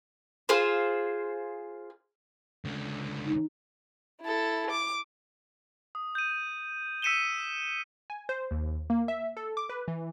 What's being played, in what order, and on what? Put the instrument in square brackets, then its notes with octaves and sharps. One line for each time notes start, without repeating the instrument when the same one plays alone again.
[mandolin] F4 G#4 C5
[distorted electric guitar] C#2 D3
[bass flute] D#4
[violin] E4 A4
D6
[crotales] D#6
G6 D#7
E6 B6 C#7 D#7 E7 G7
[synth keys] G#5
C5
D#2
A#3
E5
A4
D6
B4
E3